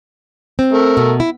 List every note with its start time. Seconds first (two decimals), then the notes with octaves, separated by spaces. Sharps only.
0.59 C4
0.73 A3 A#4
0.97 B2
1.20 E4